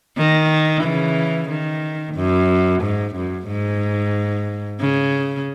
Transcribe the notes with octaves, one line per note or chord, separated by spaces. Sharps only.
D#3
C#3 E3
D#3
F#2
G#2
F#2
G#2
C#3